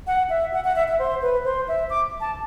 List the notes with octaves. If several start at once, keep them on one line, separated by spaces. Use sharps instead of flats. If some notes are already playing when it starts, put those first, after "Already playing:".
F#5
E5
F#5
F#5
E5
E5
C5
B4
C5
E5
D6
A5